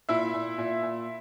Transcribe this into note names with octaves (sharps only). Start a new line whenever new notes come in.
A#2 E4 E5
A#2
A#2
A#2